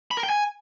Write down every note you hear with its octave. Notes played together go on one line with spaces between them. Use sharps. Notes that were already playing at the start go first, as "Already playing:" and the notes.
B5
A#4
G5
G#5